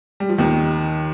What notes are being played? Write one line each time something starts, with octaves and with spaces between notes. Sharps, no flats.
G3
F3
D#2 D#3